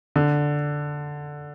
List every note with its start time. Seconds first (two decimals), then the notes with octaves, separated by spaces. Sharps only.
0.16 D3